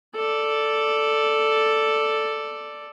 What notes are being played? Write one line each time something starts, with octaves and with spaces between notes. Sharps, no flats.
A4 D5